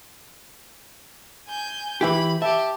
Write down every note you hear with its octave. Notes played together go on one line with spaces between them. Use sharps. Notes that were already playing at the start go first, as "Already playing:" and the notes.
G#5 G6
E3 E4 G4 B5
G4 E5 A5